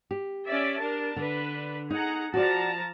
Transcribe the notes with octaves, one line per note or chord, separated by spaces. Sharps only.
G4
C#4 D5 E5
D4 A#4 A5
D3 D4 B4
D#4 G#4 F#5 A#5
F3 F#4 C#5 D5 A5 A#5